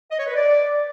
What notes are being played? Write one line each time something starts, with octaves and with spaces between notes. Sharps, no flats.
D#5
C#5
B4
D5